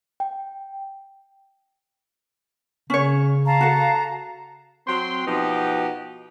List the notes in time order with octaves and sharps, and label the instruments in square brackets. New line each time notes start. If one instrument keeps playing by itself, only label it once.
[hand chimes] G5
[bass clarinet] C#3 [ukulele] C#4 C#5
[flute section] F5 A5 A#5
[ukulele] F#4 A4
[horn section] F#3 C4 G5 C6
B2 F3 B3 D#4 G4